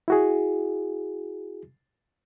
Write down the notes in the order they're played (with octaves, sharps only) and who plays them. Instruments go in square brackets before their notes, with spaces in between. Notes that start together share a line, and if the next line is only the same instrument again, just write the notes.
[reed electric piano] E4 F#4 G#4